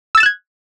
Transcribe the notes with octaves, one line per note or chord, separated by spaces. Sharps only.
E6 F#6 G#6 A6 E7